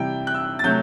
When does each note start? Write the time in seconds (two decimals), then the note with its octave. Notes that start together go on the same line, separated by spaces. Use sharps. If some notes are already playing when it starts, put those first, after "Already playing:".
Already playing: C3 E3 G3 G5
0.27 F#6
0.35 E6
0.59 A6
0.64 C3 F#3 A3 G6